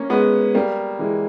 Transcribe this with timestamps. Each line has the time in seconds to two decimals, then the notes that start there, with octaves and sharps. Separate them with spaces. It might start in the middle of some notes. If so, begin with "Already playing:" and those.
Already playing: A#3 C#4
0.10 G#3 B3
0.55 G3 A#3
0.99 E3 G#3